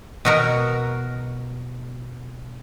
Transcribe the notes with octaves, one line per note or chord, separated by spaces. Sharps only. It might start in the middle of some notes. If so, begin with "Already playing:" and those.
B2 F#4 A#4